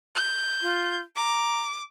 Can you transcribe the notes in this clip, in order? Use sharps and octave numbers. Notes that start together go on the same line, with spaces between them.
G6
F4
A#5 D6